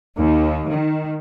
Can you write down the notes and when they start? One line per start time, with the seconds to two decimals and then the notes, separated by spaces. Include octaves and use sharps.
0.19 D#2
0.71 D#3